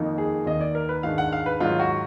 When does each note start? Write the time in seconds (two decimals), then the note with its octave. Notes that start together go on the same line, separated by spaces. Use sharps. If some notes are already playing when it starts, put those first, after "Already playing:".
Already playing: F2 D#3 A#3 D#4
0.18 G#4
0.46 D#2 D#3 A#3 D#5
0.61 D5
0.75 A#4
0.89 B4
1.03 G#2 D#3 G#3 D4 F5
1.18 F#5
1.33 F5
1.46 B4
1.60 G#2 D#3 F#3 F4
1.80 F#4